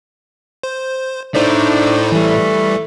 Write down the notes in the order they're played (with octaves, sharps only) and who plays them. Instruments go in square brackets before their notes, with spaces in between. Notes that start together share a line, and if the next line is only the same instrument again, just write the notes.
[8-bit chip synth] C5
[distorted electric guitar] A2 [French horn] D4 [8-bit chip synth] D#4 C5 D5
[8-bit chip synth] E3 G3 [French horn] A3